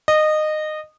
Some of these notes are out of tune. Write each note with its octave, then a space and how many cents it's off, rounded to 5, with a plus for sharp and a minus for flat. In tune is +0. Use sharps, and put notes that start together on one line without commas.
D#5 -20